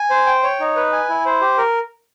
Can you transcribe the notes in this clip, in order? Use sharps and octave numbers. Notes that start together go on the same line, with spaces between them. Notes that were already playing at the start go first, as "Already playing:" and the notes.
Already playing: G#5
C5
G5
C#5
D#4
B4
G#5
E4
C5
G4
A#4